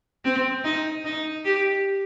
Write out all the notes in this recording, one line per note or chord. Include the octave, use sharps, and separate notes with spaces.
C4
D#4
D#4
G4